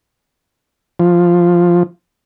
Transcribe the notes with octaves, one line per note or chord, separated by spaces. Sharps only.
F3